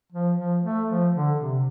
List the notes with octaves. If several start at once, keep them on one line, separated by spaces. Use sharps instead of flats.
F3
F3
A3
F3
D3
C3